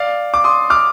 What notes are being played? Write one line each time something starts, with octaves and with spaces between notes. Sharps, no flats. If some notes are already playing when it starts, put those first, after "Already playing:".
Already playing: D5 F5
D6
C6 D#6
D6 F6